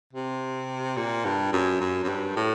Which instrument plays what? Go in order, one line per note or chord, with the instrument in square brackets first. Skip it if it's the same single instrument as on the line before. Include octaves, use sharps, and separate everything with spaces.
[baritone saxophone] C3
A#2
G2
F#2
F#2
F#2
G2
A2